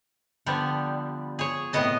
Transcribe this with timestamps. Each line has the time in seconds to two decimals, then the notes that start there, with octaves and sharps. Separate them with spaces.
0.46 D3 F3 G3 B3
1.39 G#4 C#5
1.73 A2 C3 B3 D#5 A5